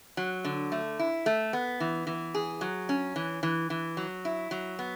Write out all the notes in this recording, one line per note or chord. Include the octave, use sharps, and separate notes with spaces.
F#3
D3
A3
E4
A3
B3
E3
E3
G#4
F#3
C#4
E3
E3
E3
F#3
E4
F#3
B3